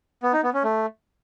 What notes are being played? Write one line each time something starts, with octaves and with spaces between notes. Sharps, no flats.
B3
D#4
B3
C#4
A3